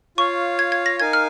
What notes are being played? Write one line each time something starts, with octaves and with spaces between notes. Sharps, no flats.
F4 C#5 F5 C#6
G#6
G#6
A#6
D#4 A#4 F5 G#5 G#6
F6